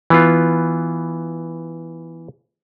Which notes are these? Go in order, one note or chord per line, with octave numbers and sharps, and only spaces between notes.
E3 B3 F4